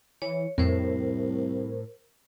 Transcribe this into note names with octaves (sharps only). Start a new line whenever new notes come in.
E3 C#5
C2 F2 A2 A#4 C5